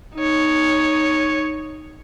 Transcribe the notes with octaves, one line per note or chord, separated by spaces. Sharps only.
D#4 C#5